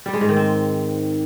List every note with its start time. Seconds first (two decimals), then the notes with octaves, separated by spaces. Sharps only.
0.06 G3
0.13 G#3
0.21 G#2
0.29 D#3
0.37 C4